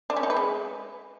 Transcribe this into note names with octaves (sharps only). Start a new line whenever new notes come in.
D4
C#4
D#4
B4
G#3